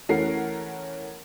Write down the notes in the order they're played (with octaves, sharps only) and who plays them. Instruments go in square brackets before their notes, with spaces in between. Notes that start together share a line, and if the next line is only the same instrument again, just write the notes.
[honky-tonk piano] E3 A3 C#4 A#4 F#5 C7